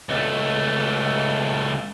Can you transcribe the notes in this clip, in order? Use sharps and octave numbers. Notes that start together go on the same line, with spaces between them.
C#2 A3